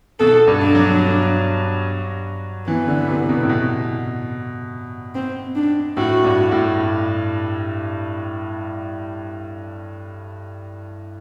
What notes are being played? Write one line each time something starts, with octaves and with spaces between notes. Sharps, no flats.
B2 A4
G2
D4
F#3
E3 B3
D3
C3
B2
A2
B2
C4
D4
A2 F#4
G2
A2